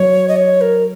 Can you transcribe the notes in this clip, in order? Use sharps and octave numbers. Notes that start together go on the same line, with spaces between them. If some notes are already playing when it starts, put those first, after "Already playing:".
Already playing: F#3 C#5
D#5
C#5
A#4